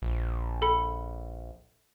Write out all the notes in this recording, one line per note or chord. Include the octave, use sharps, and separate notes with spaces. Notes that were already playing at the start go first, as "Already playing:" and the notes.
A#1
A4 B5 C#7